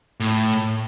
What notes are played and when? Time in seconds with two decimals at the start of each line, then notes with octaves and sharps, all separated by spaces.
0.20 A2